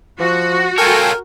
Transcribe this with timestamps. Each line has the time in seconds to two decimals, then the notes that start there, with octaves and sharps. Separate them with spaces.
0.20 F3 F#4
0.78 F4 A4 A#4 C#5 G5 G#5